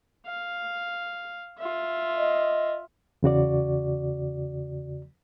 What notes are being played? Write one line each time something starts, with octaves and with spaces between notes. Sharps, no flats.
F5
F4 E5
D#5
E2 C#3 F#4 D5